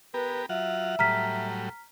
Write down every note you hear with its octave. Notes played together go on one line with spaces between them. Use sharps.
B3 G4 A#4 B4
F#3 F4 E5 F#5
A2 F#3 G3 A#5 F6 B6